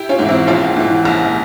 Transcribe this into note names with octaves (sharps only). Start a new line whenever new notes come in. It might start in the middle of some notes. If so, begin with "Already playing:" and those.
Already playing: E4 G4
C#4 F4
G#2 E3
C4 E4
A#1 C#4 F4
G#2 E3
A#1